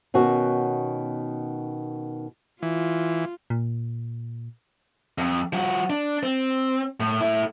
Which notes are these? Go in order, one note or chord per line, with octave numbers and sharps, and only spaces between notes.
B2 D#3 C#4 F#4
E3 F4
A#2
F2
F3 F#4
D4
C4
A2
A3 E4